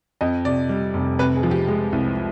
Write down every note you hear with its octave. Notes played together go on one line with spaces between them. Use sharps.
F2 D#5
C3 D5
G3
F1
C3 B4
G#4
F3
G4
G#3 G4
C2